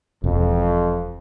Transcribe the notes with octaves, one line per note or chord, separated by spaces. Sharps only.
E1 F2